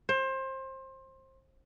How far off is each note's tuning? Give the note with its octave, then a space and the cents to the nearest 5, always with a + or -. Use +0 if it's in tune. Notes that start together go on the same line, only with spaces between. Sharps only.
C5 +25